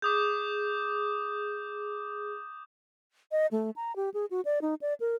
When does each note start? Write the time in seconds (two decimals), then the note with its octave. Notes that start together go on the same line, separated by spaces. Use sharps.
0.02 G#4 D6 D#6 G6
3.32 D#5
3.51 A3
3.76 A#5
3.96 G4
4.14 G#4
4.31 F#4
4.45 D5
4.62 D#4
4.81 D5
5.00 A#4